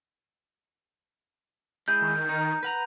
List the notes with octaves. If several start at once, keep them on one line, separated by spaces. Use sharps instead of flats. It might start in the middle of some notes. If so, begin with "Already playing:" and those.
G#3 E4 G#4 G6
D#3
D#4
B4 F#5 A#5